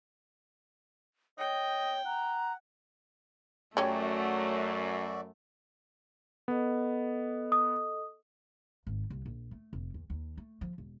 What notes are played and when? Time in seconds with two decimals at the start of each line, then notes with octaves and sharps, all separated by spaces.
1.39 C#5 D#5 G5
2.05 F#5 A#5
3.77 F#2 F#3 A3 C#4 F#4 G4 D5 E5
6.48 B3 A4 D#5
7.52 D#6
8.87 G#1
9.10 C2
9.26 A#1
9.51 A3
9.73 F1
9.94 E2
10.10 D#2
10.37 A3
10.61 F3
10.78 E1